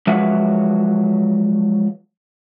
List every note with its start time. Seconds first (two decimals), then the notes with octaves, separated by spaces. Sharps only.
0.07 F3 F#3 G#3 B4 E5 F#5